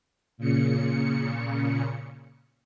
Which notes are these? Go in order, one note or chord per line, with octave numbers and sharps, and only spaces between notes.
A#2 C#3 C#7